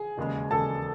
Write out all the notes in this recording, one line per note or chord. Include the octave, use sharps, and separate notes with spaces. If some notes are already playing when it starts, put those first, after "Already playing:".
Already playing: G#4 G#5
E1 D#2 C#3 G#3
E1 D#2 C#3 G#3 A4 A5